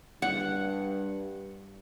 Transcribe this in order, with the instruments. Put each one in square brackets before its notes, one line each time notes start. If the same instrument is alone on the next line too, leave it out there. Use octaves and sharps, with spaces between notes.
[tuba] G2 [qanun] F#5